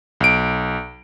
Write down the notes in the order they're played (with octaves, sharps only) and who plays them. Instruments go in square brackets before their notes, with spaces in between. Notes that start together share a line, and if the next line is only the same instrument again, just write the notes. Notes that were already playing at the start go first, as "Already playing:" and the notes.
[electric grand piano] B1 D7